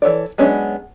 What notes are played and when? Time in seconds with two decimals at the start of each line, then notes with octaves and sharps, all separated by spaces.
0.02 E3 A4 C#5 D5
0.38 F#3 G#3 B3 C#4 D4